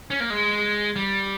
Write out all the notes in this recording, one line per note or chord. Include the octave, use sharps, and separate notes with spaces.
C#4
A#3
G#3
G3